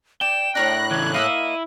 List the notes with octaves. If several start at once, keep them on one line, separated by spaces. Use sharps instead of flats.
D5 G5 E7
A2 D4 A#4 C#5 F#6 A#6
C#3 E3 G#6
A#3 E4 D#5 E6 D#7